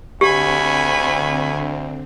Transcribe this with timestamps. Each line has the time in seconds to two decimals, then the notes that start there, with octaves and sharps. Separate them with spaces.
0.21 D2 D3 C4 G4 G#5 B5 C#6